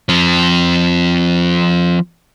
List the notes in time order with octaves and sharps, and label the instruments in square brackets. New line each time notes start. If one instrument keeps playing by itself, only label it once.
[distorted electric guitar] F3 C4